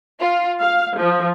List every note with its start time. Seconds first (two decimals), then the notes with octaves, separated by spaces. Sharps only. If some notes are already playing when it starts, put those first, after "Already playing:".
0.20 F4
0.60 F5
0.96 F3